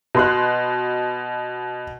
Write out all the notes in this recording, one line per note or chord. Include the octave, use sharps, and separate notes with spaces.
B2 C6 F#6